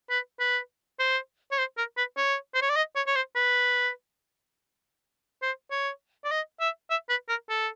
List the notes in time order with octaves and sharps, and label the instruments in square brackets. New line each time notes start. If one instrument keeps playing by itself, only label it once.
[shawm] B4
B4
C5
C#5
C5
A#4
B4
C#5
C5
C#5
D5
D#5
C#5
C#5
C5
B4
C5
C#5
D5
D#5
E5
E5
B4
A#4
A4